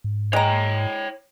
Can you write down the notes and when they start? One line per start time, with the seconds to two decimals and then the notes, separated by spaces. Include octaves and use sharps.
0.04 G#2
0.33 G#3 C#5 G5 A#5